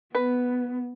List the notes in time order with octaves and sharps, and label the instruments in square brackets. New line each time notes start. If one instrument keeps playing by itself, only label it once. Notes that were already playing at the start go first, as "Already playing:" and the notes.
[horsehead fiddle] B3 [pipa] B4